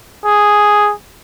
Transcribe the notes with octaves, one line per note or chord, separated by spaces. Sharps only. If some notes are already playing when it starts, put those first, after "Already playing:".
G#4